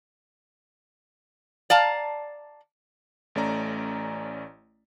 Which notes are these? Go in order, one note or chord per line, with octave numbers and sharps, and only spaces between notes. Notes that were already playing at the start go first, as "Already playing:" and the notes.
D5 F5 A5 A#5
A1 A3 C#4 D5 A#5